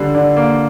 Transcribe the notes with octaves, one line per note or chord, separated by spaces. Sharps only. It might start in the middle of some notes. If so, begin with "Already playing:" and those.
Already playing: D3 G3
D3
A#3